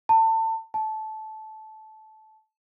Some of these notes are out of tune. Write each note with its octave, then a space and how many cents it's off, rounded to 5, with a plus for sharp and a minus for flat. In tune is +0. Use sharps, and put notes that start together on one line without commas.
A5 +30
A5 -15